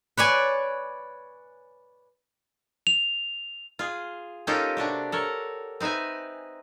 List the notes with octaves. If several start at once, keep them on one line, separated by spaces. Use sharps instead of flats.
B4 C#5 D5 G#5
F7
F4 G#4
A#3 C#4 D#4 F4 G4 A4
C3 D4 F#4 G4
A4 A#4 C#5
C4 D#4 B4 E5 G#5